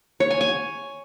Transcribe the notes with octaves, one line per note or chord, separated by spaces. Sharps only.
C#5
G#5
G#5